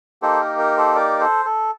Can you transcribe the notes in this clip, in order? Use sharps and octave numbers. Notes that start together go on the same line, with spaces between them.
A#3 D#4 G4 A4 C5
A#4
A#4
A4 C5
A#4 D5
A4 C5
A4